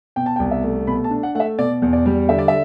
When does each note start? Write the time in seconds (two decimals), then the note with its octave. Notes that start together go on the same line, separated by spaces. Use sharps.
0.16 B2 G5
0.26 A5
0.36 G5
0.39 C2
0.51 E5
0.64 A3
0.87 B2 B5
1.04 A5
1.10 D4
1.23 F#5
1.35 A3 F#5
1.40 E5
1.58 B2 D5
1.82 E2
1.93 D5
2.06 G3
2.29 D3 E5
2.39 D5
2.48 E5